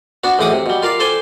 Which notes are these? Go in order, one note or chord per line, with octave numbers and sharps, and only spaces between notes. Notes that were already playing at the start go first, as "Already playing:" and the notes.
B3 D4 F#4
B1 E2 A2 F#5 D6 D#6
C3
B2 G3
F4 A#4 D5 F5
A4 C5 D5 G5 G#5